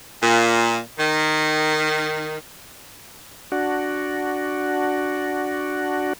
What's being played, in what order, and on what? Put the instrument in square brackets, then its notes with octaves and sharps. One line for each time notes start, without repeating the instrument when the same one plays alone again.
[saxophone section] A#2
D#3
[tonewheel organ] D4 F#4